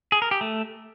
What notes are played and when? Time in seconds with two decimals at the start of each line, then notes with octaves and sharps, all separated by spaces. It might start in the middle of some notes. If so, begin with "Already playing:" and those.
0.12 G#4
0.22 A#4
0.31 G4
0.41 A3